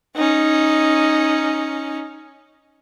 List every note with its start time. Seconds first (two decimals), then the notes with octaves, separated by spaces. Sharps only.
0.16 C#4 D#4